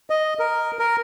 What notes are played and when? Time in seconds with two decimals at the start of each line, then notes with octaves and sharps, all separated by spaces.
0.10 D#5
0.39 A#4
0.79 A#4